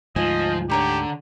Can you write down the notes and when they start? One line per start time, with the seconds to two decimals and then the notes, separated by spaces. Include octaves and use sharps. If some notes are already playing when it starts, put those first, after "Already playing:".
0.16 D2 G#2 F3 D#5 G#5
0.70 D3 G4 C#5 A#5 C#6